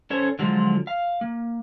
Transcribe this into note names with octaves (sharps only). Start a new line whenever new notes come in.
C#4 A4 C5 C#5
D3 F3 F#3 G#3 F4
F5
A#3